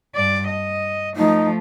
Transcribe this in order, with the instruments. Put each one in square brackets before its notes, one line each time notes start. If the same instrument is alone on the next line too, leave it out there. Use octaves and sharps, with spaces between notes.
[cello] G2 D5
D#5
[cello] F3 A3 [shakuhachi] D#4